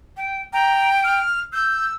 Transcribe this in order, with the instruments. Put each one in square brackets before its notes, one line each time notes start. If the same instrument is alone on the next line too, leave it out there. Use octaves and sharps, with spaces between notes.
[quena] G5
[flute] G5 [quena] A#5
[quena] F6
[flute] E6 [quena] G6